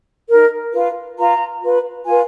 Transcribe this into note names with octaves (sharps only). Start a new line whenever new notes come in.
D#4 A#4
F4 B4
F4 B4 A#5
F4 B4
F4 B4 G#5